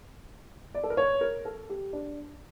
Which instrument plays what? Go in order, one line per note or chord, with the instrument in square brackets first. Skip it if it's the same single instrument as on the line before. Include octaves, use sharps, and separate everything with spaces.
[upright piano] D5
A4
A#4
C#5
A#4
A4
G4
D4